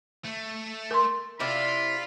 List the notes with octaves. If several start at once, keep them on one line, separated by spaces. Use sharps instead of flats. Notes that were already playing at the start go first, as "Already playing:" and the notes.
A3
A#4 C6
C3 E4 F4 D5 B5